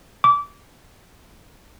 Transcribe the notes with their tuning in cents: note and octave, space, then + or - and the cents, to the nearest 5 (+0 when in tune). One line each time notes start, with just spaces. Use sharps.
D6 -25